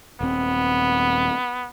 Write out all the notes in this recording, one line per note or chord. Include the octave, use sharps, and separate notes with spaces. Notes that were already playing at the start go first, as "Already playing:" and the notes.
D#1 B3 C4